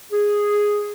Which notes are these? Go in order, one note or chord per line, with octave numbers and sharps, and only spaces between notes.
G#4